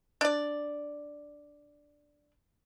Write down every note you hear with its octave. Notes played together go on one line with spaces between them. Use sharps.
D4 D5